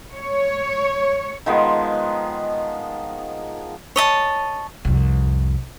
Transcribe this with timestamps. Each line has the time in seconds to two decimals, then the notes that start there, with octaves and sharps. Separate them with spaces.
0.15 C#5
1.46 D#3 F3 G#3 B3
3.96 C#5 D#5 A5
4.85 C2 F2